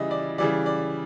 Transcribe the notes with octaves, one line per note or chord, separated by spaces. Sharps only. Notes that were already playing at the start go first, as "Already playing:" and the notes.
Already playing: C#3 E3 G3 D#5 E5
D5
C#3 E3 G3 D5
D5